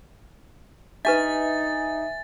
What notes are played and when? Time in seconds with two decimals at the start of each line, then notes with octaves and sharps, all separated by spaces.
1.05 D4 D#4 G4 B4 E5 G#5 A6